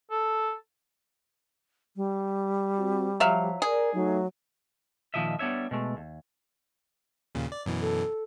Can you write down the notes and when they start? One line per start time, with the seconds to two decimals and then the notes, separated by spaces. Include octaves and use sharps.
0.11 A4
1.96 G3
2.76 C4 F#4
3.20 F3 F#3 E5 F5
3.62 G#4 A#4 D5
3.94 F#3 A3 D#4
5.14 A#2 D#3 F3 D#5 E5
5.39 G3 B3 D4 C#5 E5
5.71 B2 G#3 A3
5.97 D#2
7.35 D#2 A#2 C#3
7.52 D5
7.66 F#2 B2 E3
7.81 A4